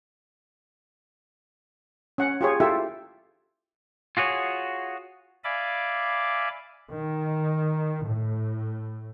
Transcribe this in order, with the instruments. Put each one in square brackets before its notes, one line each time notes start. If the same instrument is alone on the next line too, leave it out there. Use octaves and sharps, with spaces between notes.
[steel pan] C#4 F#5
F4 G4 G#4 C#5
E4 F4 G4 A4 E5
[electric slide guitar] F4 F#4 G#4 C#5
[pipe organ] D5 E5 F5 G#5 B5 D6
[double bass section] D#3
A2